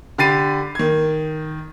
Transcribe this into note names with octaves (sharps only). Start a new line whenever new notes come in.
D3 G4 B5 A6 C7 D#7
D#3 G#6